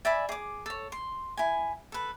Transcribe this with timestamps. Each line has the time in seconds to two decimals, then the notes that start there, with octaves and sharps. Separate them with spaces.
0.05 D5 E5 G#5 B5
0.29 G#4 D6
0.66 A4 C#5
0.92 C6
1.37 E4 G#5
1.92 A4 B4